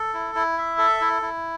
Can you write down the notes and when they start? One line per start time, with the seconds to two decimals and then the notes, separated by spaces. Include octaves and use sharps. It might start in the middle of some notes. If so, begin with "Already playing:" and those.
Already playing: A4
0.14 E4
0.35 E4
0.58 E5
0.78 A4
1.01 E4
1.22 E4